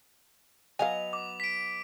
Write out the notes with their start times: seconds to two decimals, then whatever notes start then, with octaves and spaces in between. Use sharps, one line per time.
0.79 F#3 B3 D#5 F5 G#5 F7
1.13 D6
1.40 B6 D7